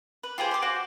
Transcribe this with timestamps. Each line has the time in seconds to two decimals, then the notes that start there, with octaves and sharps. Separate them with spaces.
0.23 B4
0.38 F4 G4 G#4 C5
0.51 C6 D6
0.62 F#4 C5 F5 D6